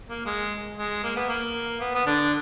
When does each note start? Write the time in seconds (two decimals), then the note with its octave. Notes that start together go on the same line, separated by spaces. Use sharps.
0.09 A#3
0.26 G#3
0.78 G#3
1.03 A#3
1.16 B3
1.29 A#3
1.81 B3
1.95 B3
2.05 D3 D4